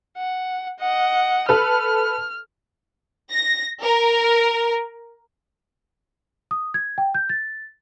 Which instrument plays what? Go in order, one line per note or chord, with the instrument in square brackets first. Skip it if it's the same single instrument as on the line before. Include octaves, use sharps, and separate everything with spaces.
[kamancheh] F#5
D#5 F#5
[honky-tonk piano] A4 B4 [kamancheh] F6
[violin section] A#6
A#4
[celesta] D#6
G#6
G5
G6
A6